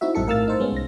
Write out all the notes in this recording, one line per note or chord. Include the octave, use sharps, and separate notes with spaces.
C4 D#4 E4 F#4 E5
A#1 G2 C4 A4 C#7
A2 A#4 F5 E6 F6 A6
D#4 C5
G#3 B3 C#4
C2 A#6